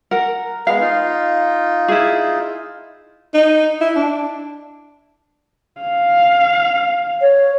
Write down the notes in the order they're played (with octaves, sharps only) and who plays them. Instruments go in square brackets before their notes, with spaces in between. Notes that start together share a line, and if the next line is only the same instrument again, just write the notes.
[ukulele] A#4 F#5
[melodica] G#3 B3 [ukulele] F5
[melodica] D#4 F4
[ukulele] E4 G#4
[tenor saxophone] D#4
E4
D4
[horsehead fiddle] F5
[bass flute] C#5